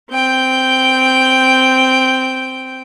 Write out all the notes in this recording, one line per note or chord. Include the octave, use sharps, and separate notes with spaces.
C4 G5 G6